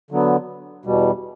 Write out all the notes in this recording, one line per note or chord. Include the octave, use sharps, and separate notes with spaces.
D3 F#3 B3
E2 B2 G3